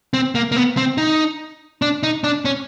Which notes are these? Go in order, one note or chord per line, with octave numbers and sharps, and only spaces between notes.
C4
A#3
A#3
B3
C4
D#4
D4
D#4
D4
C#4